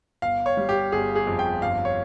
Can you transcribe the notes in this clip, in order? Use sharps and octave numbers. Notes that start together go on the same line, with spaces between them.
G1 F5
C#5
G3
G4
G1 G#4
G#4
F2
G5
G2 F5
C#5